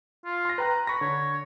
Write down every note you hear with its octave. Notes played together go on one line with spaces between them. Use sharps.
F4
C6 A#6
B4 G5 A#5 F#6
B5 C#6 A#6
D3 C#5